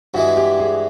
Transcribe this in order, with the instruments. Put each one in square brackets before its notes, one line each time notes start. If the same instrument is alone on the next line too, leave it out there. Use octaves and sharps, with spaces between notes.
[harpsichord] G2 E3 G#3 [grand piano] F#4
[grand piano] G4
G#4